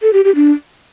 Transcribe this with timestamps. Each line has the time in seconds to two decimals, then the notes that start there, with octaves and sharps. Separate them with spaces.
0.02 A4
0.13 G4
0.24 G4
0.35 D4